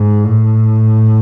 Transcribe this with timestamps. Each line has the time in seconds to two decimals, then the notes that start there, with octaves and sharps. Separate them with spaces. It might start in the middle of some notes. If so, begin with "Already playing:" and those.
Already playing: G#2
0.24 A2